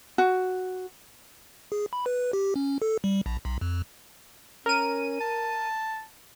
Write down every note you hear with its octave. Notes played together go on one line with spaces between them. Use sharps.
F#4
G#4
B5
B4
G4
C#4
A4
G3
A#1
B1
F2
C#4 A#4 D#7
A5